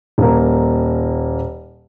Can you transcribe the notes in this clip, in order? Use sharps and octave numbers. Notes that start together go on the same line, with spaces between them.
D#1 A#3